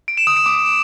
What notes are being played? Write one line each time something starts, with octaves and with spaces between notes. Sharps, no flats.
D7
E7
D#6
D7
D6